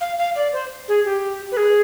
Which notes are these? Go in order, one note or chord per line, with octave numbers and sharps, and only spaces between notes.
F5
F5
D5
C5
G#4
G4
B4
G#4